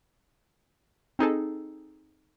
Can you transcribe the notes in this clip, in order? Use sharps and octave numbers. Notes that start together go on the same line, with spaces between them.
C4 D#4 G#4 A4